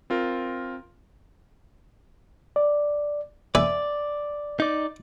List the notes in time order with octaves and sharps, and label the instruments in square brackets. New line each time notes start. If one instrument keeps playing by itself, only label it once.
[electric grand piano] C4 F4 A#4
[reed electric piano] D5
[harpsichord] B4 E5 G#5 [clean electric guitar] D5
[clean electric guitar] D#4 D5